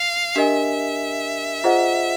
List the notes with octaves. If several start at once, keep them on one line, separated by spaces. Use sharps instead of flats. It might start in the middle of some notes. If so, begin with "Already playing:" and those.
Already playing: F5
D4 G4 A#4 D#5 E5 G#5
F4 G#4 C5 D#5 F#5